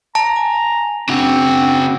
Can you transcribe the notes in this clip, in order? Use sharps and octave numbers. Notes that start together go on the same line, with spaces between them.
A5 A#5
G#5
C#3 C4 D4 F#4